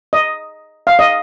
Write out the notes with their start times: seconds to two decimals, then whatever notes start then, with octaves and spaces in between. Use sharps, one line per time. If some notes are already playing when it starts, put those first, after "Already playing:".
0.13 D#5
0.87 F5
0.99 D#5